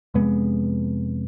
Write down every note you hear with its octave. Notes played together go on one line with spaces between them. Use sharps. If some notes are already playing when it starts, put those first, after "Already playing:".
F2 C3 G#3 B3